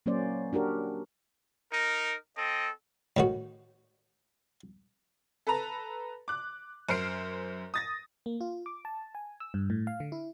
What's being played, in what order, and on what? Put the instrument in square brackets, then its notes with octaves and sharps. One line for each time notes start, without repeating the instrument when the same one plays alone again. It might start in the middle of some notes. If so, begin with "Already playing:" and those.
[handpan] F#3 A#3 C#4 C5 D5
D4 F#4 G4 A#4
[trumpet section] D#4 A#4
C4 A4 D#5
[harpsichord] A2 D#3 F#4
[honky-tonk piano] A4 B4 A5 A#5
D6 F#6
F#2 C5 F6 C7 D7
D#6 A6 A#6
[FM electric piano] A#3
F4
D6
A5
G#5
E6
G2
A2
F5
D3
E4